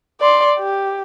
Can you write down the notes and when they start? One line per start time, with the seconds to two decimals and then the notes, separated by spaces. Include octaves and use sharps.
0.21 D5 C6
0.59 G4